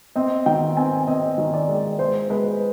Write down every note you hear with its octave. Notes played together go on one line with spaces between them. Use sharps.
C4 D#5
D#3 G5
C4 G#5
C4 D#5
D#3
D5
G#3
G#3 C5
G#3 B4